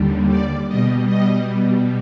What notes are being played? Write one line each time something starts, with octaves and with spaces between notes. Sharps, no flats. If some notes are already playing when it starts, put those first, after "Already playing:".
Already playing: D#2 D3 G3
D5
B2 G3 D#5
D#5